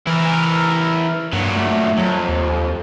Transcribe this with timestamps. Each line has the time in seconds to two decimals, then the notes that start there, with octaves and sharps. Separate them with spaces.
0.07 E3 E4 A#4
1.33 G2 A#2 F#3
1.56 A3
1.97 F2 F#3
2.29 D#2